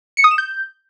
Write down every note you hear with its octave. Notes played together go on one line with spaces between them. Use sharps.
C#7
D#6
E7
G6